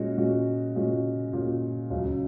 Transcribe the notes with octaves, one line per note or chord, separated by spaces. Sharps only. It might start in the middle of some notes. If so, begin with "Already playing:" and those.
Already playing: A#2 G#3 C#4 F#4
A#2 G#3 C#4 F#4
A#2 G#3 C#4 F#4
A#2 G#3 C#4 F#4
C#2 C#3 F#3